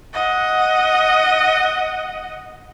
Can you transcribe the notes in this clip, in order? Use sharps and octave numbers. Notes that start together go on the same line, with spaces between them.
D#5 F#5